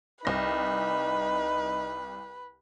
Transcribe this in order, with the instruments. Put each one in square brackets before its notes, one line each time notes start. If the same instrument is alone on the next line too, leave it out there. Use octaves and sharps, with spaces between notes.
[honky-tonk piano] C2 A#6 [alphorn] D#4 [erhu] B4